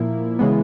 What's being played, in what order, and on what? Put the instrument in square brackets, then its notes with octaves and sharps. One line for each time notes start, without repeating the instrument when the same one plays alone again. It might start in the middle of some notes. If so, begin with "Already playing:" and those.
Already playing: [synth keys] A#2 F3 A#3 E4
C#3 E3 G#3 B3